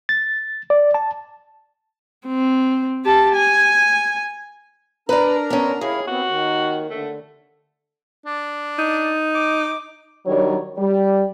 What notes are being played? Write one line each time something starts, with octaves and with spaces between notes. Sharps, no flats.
A6
D5
A5
C4
G4 A5
G#5
D4 A#4 B4 D5 A#5
B3 C#4
D#2 E4 G#4 C#5 F5
B3 C4 F#4
D#3
D3 A3
D4
D#4
D6
D#3 F#3 G3 D4 C#5
G3